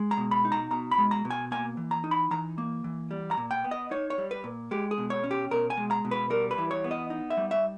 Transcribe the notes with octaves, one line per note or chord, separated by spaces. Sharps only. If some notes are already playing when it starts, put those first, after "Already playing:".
Already playing: G#3
A#5
B2
B5
D#4
A#5
B2 A#5
B5
G#3
A#5
B2
G#5
A#3 G#5
E3
A#5
D#4
B5
E3 A#5
A#3
E3
G3
A#5
A#2
G5
B3
D#5
D#4 C#5
C#5
G3
B4
A#2
G#3 G4
G#4
B2
C#5
C#4
G4
B2 A#4
G#5
G#3
A#5
B2
B4
G3 A#4
B4
E3
C#5
B3
D#5
D#4
E5
G3
E5